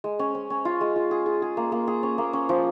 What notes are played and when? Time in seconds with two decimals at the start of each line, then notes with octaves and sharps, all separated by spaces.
0.04 G#3
0.19 C#4
0.35 C#4
0.50 C#4
0.65 F4
0.81 G#3
0.96 F4
1.11 G#4
1.26 G#4
1.42 G#4
1.57 A#3
1.72 A#3
1.87 G#4
2.03 C#4
2.18 A#3
2.33 C#4
2.49 F3